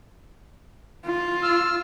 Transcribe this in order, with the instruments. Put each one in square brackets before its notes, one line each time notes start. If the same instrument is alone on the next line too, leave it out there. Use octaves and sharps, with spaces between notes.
[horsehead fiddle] F4
[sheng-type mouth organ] E6 F6